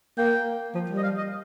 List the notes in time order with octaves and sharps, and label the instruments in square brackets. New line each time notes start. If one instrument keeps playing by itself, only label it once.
[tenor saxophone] A#3 [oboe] G5
[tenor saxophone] F3
G3
[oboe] D#5
F5
D#5